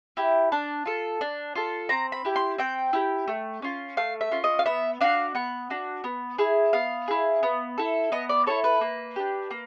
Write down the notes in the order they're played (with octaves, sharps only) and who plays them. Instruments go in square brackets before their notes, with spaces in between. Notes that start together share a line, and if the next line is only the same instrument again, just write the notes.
[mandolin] E4 G4
D4 A5
F4 A4
D4
F4 A4
C4 A#5
B5
E4 G4
C6
C4 G5
E4 G4
A3
C#4 F4
A3 F5
E5
C#4 F4
D#5
F5
B3 E5
D4 F#4 F5
B3 F#5
D4 F#4
B3
E4 G#4
B3 F5
E4 G#4
B3
E4 A4
B3 D#5
D5
E4 A4 C#5
B4
A#3
D4 G4
A#3